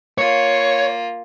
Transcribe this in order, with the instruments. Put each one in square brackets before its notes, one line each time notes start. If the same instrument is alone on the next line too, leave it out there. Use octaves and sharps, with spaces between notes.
[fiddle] A#3 F4 [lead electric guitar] C#5